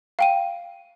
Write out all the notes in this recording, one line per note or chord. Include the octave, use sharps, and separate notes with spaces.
F5 G5 D#7